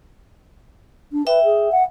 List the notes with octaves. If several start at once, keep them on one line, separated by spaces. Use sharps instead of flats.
D4
B4 E5 G5
G#4
F#5